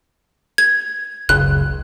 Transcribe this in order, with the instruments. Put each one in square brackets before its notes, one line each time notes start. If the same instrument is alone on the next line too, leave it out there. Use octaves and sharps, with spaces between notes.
[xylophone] G#6
[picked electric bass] F#1 C#2 [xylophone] F#6